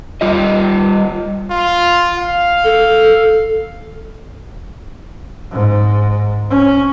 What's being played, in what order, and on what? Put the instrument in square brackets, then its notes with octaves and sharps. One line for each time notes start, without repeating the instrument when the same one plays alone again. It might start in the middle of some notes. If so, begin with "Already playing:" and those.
[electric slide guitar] G3 F4 D#5
[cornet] F4
F5
[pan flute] A4
[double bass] G#2
C#4